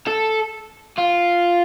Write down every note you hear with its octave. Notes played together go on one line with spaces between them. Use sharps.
A4
F4